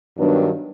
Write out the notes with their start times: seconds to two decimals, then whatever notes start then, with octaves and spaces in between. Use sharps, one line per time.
0.16 G2 D#3 F#3 B3 D4